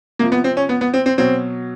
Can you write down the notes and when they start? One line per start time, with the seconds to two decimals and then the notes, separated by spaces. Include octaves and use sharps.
0.19 C3 F3 A#3
0.32 B3
0.44 C4
0.57 C#4
0.69 B3
0.81 B3
0.94 C4
1.06 C4
1.18 B2 F#3 C4